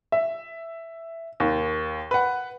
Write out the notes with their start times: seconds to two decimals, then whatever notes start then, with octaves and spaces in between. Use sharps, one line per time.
0.12 E5
1.40 D#2
2.11 B4 F#5